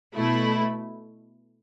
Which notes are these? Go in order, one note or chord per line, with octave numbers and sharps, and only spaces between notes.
B2 A3 E4